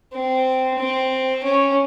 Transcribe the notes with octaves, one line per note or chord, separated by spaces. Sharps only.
C4
C4
C#4